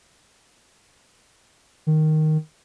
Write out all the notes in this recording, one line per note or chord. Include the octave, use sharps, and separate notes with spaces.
D#3